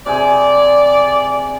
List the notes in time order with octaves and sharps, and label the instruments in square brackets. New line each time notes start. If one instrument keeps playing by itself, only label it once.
[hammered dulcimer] C3 G#4 [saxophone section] D5